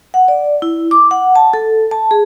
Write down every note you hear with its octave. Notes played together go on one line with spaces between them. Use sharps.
F#5
D5
E4
D6
F#5
A5
A4
A5
G#4